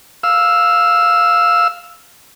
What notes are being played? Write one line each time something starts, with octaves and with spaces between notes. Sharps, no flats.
F5 E6